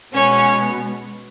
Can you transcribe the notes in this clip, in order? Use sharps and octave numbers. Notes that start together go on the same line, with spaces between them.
B2 G#3 B3 C#4 C#5